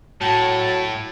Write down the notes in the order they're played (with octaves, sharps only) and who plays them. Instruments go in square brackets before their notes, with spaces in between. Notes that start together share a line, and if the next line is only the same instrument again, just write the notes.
[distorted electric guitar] A2 [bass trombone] F#3 [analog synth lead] A5